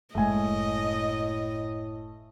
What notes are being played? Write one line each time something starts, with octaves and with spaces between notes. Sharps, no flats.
F#1 A2 G#3 A3 D#5 G#5